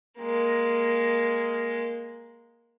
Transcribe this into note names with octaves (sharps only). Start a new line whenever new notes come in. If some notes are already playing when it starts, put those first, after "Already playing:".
G#3 A#3